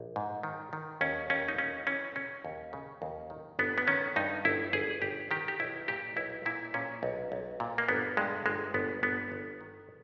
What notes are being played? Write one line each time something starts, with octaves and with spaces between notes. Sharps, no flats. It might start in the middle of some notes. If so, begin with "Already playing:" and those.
Already playing: A#1
G#2
D#3
D#3
D#2 C#4
D#2 C#4
D#4
D#2 C#4
E3 C#4
C#3 C#4
D#2
C#3
D#2
D#3
G1 B3
B3
D#3 C#4
G2 D#4
G1 E4
G1 G#4
G1 G4
D#3 G4
G4
B1 E4
A#2 G4
B1 E4
A#2 E4
A#2 C#4
B1
B1
A#2
A#3
G1 B3
G2 G#3
G1 G#3
G1 B3
G1 B3
G1
D#3